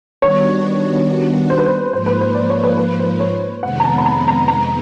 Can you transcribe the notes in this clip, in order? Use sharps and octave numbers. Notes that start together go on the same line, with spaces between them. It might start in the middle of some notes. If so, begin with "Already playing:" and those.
D#3 G3 B3 D4 F#4 C#5
C5
B4
C5
G#2 F3 A#3 C5
B4
C5
D5
C#5
B4
B4
C5
C#5
F2 C3 D#3 G#3 B3 F#5
A#5
A5
B5
A#5
A#5
A#5